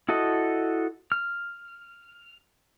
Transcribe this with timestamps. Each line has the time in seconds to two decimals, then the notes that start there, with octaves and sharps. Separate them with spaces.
0.09 E4 F#4 A4 D#5
1.12 F6